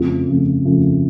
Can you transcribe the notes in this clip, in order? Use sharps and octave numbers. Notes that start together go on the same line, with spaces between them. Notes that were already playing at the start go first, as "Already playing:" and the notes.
Already playing: F2 C#3 F3 A3
F2 C#3 F3 A3
F2 C#3 F3 A3